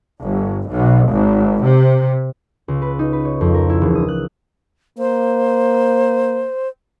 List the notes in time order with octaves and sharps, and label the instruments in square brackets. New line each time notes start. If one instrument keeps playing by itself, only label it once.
[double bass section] G1
B1
G#1
C3
[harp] C#2
B4
D#4
B4
C#5
F2
A#4
E4
E1
D#6
F#6
[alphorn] A#3 [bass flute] C5